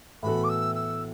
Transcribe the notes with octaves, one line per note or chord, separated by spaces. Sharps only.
A2 E3 B3 F#4 A4 B5
D6
E6
E6